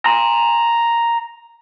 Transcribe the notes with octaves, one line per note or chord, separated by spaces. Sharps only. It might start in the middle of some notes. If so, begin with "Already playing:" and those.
A#5 C6